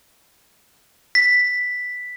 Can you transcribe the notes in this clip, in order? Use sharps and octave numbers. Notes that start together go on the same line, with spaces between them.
B6